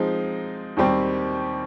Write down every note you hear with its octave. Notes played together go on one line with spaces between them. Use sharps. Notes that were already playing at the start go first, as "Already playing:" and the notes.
Already playing: F3 G#3 C4 D#4
D#2 D#3 G3 C4 G4